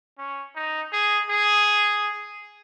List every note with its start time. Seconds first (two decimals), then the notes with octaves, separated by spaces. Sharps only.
0.18 C#4
0.56 D#4
0.93 G#4
1.30 G#4